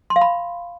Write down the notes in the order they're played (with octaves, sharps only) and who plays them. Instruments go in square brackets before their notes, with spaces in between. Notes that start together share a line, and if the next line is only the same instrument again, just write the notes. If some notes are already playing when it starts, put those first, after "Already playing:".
[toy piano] C6
F5
B5